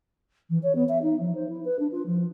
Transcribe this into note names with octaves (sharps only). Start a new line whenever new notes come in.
E3
C#5
B3
E5
D#4
F3
C5
E4
B4
D4
F4
F3